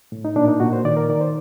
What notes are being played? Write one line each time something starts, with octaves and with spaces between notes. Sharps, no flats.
A2
D#4
A#2 D4
D#4
A#2 F#4
C5
D#3 D5
A#4
D#3 D5
C5